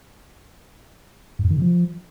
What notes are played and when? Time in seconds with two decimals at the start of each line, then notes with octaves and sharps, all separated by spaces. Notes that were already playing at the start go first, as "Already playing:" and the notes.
1.39 G2
1.45 F#2
1.50 D#3
1.56 C3
1.62 F3